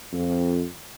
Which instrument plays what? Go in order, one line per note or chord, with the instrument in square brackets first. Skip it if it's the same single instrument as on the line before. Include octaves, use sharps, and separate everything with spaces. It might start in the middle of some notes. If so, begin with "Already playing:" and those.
[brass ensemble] F2